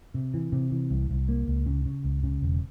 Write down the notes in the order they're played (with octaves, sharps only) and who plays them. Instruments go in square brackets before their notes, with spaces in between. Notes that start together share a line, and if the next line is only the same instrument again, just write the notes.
[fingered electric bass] C3
E3
C3
E3
C2
C2
A#3
C#2
C#3
C#3
C#2
C#3
E1